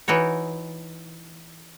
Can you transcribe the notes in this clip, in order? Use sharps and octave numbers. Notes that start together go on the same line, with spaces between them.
E3 D#4 F#4 C#5